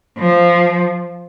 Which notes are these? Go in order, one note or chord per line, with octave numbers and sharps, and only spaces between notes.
F3